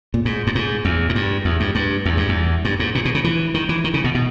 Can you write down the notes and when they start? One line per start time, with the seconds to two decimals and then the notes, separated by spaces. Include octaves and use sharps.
0.14 A#2
0.25 G#2
0.47 G2
0.55 G#2
0.85 E2
1.09 G#2
1.15 G2
1.45 E2
1.60 G2
1.75 G2
2.06 E2
2.17 G2
2.29 E2
2.65 G2
2.80 G#2
2.95 A#2
3.05 B2
3.15 C#3
3.24 E3
3.54 D#3
3.69 E3
3.84 D#3
3.94 C#3
4.04 B2
4.15 B2